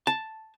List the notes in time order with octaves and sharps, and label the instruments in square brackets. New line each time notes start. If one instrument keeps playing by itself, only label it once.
[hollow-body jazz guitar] A5